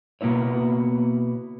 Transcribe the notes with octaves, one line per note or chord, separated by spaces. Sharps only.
B2 A#3 B3 E4 C#5